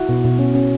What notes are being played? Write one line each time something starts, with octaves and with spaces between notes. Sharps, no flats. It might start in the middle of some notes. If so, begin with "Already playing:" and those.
Already playing: E4 F#4
B2
B2
C#4
C#4